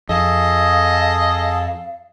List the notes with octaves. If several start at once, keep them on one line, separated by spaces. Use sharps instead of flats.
F2 G#4 A4 D#5 F5 A5